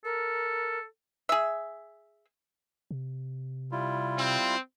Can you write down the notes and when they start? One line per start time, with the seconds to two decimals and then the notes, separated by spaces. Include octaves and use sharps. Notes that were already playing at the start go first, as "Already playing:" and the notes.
0.05 A4 A#4
1.29 G#4 E5
2.91 C3
3.72 G3 E4 F4
4.18 C4